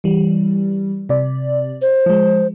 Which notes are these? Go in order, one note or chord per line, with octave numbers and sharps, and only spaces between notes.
E3 G3
C3 D5
C5
F3 G#3